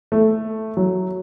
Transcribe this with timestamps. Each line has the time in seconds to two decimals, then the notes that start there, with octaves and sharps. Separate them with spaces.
0.12 A3
0.77 F#3